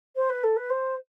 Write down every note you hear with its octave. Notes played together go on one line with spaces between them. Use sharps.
C5
B4
A4
B4
C5